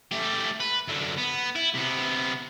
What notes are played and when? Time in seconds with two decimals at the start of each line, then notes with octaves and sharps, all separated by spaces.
0.11 A3 G4
0.60 B4
0.88 F#2 D3
1.18 B3
1.56 E4
1.75 C3 B3